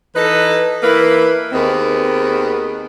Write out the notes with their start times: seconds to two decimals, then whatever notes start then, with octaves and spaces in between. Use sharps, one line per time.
0.16 E3 D#4 A4 B4
0.83 E3 A#3 E4 B4
1.52 D#2 D#3 B3 C4 G#4